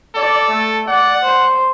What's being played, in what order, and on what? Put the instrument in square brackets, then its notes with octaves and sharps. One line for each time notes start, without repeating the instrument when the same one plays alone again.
[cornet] A4 [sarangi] D5
[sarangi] A3
[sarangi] D5 [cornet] F#5
[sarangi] C5